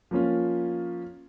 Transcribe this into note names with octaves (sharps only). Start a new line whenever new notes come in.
F3 A#3 C#4 F4